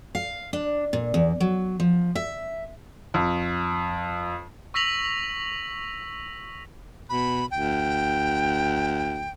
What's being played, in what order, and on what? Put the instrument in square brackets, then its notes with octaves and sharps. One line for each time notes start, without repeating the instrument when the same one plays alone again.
[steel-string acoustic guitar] F5
D4
A#2
E2
F#3
F3
E5
[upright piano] F2
[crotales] C#6 E6 A#6 B6 F7 F#7
[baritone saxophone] B2 [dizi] B5
[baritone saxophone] D2 [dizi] G5